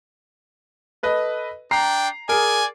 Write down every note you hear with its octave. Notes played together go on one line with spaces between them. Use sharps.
A4 B4 D#5
D4 G5 A#5 C7
G#4 A#4 D5 G#5